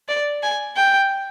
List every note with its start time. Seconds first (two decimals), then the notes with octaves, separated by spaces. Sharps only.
0.09 D5
0.43 G#5
0.76 G5